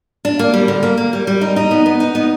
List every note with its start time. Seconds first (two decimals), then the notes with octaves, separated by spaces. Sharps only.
0.25 D4
0.39 A#3
0.54 G3
0.68 D3
0.83 A#3
0.97 A#3
1.13 G3
1.27 G3
1.41 D#4
1.56 D#4
1.71 B3
1.86 B3
2.00 D#4
2.15 B3